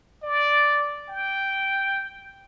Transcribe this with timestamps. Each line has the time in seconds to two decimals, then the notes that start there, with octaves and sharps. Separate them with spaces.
0.23 D5
1.10 G5